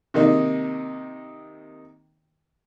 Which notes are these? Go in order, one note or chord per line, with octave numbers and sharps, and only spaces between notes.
C3 D#3 A#3 D#4